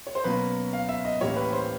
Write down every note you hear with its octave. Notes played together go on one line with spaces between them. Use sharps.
C#5
C5
B2 F#3 A#3 C#4 B4
F5
E5
D#5
A2 E3 G3 A#3 C#4 C#5
B4
C5